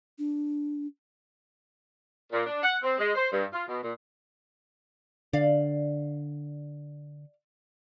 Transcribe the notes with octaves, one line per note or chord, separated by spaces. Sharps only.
D4
A#2
D4
F#5
C4
G#3
C5
G2
F4
B2
A#2
D3 D5 F5